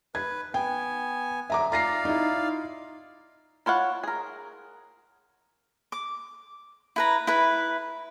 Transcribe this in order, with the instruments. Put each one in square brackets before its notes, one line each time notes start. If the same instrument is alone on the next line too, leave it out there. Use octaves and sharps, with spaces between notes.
[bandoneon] B4 [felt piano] G#6
[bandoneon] B3 G#5 [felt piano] G5
[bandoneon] D3 F#3 [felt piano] E5 A#5 D6
[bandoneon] F4 D5 F5 [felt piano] A#5 A#6 C7
[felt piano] D#4 E4
[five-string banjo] E4 F4 C#5 F#5
G#4 A#4
[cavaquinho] D6
E4 B4 A#5
E4 B4